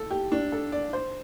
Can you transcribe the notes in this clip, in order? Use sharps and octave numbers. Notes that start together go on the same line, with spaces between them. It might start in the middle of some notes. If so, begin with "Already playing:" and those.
Already playing: A4
G4
D4
A4
D5
C5